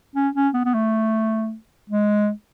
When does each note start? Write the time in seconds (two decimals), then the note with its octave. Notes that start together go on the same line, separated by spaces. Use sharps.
0.15 C#4
0.35 C#4
0.54 B3
0.65 B3
0.74 A3
1.90 G#3